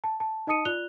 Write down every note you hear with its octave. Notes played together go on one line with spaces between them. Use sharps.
A5
A5
D#4 D#5 A5 D#6 C#7 D#7
F4 D5 F#6 F7 G7